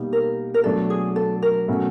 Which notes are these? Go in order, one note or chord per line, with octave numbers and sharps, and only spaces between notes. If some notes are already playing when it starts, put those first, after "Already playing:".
Already playing: B2 G3 A#3 D#4
A#4
A#4
B2 F#3 A3 D4 A4
G#4
A4
A#4
B2 F#3 A3 C#4 F#4